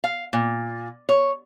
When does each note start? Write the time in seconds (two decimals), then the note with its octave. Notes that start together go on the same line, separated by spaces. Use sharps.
0.04 F5
0.33 A#2
1.09 C#5